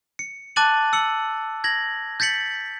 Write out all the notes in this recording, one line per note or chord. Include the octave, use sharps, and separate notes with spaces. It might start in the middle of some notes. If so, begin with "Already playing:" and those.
C#7
A5 D6 F#6 A6 D#7 F#7
E6 C#7 F#7
G#6 A#6 F#7
G6 A6 B6 C#7 F#7